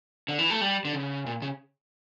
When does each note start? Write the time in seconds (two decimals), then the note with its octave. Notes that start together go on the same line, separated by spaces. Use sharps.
0.28 D3
0.39 E3
0.50 A3
0.61 G3
0.85 D3
0.93 C#3
1.27 A#2
1.42 C#3